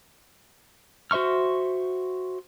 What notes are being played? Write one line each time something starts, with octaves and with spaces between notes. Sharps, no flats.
F#4 C5 E5 C#6 F6